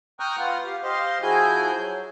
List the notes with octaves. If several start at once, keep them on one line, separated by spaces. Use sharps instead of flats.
G5 A#5 C#6 D#6 F6 F#6
B3 F4 F#5
G4 F5
G4 C5 D#5 F5 C6
F3 E4 F#4 G#4 G#5 G6
F#3